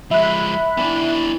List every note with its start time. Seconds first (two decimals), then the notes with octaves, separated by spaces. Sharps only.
0.11 F3 G#3 E5 B5 F#6
0.77 E3 B3 D4